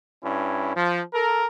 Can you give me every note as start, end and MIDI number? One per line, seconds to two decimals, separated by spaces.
0.23 0.71 43
0.23 0.71 61
0.23 0.71 64
0.75 1.00 53
1.14 1.46 69
1.14 1.46 70